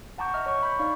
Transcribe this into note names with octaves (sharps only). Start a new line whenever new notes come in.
F#5 A5 A#5 C#6 D6 G6
D#5 E5 F6
C#5 C#6
B5 C#6 G6
D#4 D5 F5 C#6